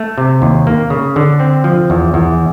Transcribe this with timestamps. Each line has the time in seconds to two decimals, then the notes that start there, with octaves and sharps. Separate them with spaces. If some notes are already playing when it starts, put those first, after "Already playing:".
Already playing: A3
0.18 C3
0.42 D#2
0.67 A#3
0.90 C#3
1.16 D3
1.40 C4
1.64 F3
1.90 E2
2.14 E2